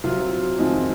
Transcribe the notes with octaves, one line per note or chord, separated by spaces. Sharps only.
C3 F#3 C4 F4
F2 D#3 G#3 C4 F4